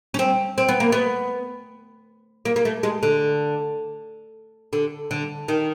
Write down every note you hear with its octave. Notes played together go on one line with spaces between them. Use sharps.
C#4
C4
C4
B3
A#3
B3
A#3
A#3
A3
G#3
D3
D3
D3
D#3